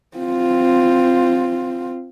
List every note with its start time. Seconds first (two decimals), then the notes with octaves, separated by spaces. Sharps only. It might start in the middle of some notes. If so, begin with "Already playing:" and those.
0.17 C4 F4